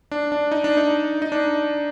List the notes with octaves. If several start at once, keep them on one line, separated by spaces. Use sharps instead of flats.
D4
D4
D#4
D4
D#4
D#4
D4